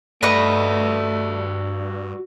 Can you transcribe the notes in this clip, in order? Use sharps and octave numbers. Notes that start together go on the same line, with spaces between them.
G2 A3 F#4 B4 D5 D#5 C#6